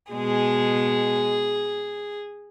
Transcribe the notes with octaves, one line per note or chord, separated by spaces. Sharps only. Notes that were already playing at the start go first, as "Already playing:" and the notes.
B2 G#3 G#4